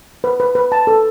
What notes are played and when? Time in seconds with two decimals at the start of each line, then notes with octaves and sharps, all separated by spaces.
0.24 B4
0.40 B4
0.55 B4
0.72 A5
0.87 A4